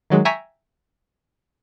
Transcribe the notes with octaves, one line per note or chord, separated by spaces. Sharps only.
D#3 F#3 G#3
E5 G5 G#5 A#5 C#6 B6